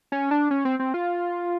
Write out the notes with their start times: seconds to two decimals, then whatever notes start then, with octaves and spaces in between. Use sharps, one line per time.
0.12 C#4
0.31 D4
0.51 C#4
0.65 C4
0.79 C4
0.94 F4